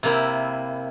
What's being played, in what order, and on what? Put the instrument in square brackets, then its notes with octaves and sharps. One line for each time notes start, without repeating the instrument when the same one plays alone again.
[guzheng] C3 A#3 E4